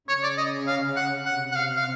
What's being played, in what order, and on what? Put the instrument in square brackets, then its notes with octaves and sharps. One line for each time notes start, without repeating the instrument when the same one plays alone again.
[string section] C#3 [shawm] C#5
[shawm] D5
D#5
F5
F#5
[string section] C3 [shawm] F#5
[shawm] F#5
F5
F5